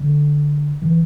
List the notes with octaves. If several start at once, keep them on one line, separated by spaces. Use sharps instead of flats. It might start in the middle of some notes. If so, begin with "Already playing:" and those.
Already playing: D3
E3